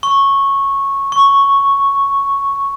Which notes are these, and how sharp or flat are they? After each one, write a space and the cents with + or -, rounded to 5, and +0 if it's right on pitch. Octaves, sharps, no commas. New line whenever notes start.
C#6 -10
C#6 +0